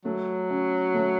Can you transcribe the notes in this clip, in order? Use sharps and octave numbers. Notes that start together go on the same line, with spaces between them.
F#3 A3
C#4
A3